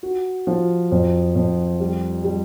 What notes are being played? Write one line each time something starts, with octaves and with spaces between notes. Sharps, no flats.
F#4
F3
F2
F2
G3
G3